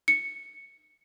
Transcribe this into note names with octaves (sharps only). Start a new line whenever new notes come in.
C#7